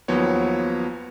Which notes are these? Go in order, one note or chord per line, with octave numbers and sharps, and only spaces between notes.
D#2 F3 F#3 B3 C#5